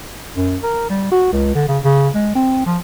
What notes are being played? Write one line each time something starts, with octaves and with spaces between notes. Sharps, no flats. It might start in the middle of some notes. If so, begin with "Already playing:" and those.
F#2
A#4
G3
F#4
C#2
D3
C#3
C#3
G#3
C4
F3